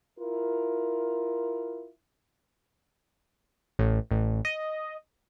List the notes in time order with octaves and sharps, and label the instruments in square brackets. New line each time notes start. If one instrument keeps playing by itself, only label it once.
[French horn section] E4 F4 A#4
[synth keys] A1
A1
D#5